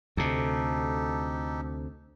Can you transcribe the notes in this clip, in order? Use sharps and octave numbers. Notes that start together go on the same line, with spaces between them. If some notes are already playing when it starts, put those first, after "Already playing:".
D2 C3 D#4 G4 A4